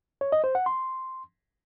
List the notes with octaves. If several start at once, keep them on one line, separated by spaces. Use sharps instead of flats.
C#5
D#5
C5
F#5
C6